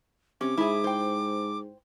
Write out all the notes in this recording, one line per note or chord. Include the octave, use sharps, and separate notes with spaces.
C3 C#4 D6
G#2 E4 G#4
C5 G5